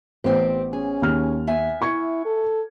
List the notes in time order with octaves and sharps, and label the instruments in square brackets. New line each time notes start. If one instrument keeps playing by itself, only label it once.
[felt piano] A1 B3 C5 [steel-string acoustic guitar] C4 G4
[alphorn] C#4 [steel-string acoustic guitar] G#4
[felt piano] D#2 F6
[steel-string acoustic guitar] B3 E5 G#5
[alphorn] E4 [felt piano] C#6 G#6 C#7
[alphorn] A4